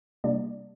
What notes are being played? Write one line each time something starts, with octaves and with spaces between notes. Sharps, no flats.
C3 G3 A#3 D4 D5